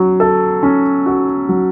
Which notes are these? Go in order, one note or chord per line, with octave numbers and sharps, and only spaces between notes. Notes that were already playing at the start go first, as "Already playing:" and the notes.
Already playing: F#3 C#4
A4
C#4
F#4
F#3